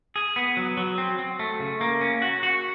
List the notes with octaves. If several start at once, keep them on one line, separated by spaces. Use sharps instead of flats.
G#4
B3
F#3
F#3
C4
C4
A3
C#3
A#3
C#4
F#4
F#4